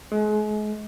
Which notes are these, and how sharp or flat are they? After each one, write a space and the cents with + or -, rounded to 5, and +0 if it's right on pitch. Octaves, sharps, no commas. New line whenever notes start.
G#3 +35